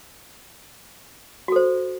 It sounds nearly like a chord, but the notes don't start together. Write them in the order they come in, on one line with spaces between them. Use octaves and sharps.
F#4 A4 C5